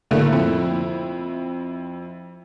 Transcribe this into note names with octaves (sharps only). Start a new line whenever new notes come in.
A2 D3 A3 A#3
F2 E4